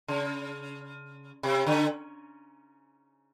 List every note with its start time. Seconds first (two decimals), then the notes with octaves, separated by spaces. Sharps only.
0.08 C#3
1.43 C3
1.66 D3